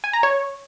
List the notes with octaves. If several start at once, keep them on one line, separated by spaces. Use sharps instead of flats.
G#5
A#5
C#5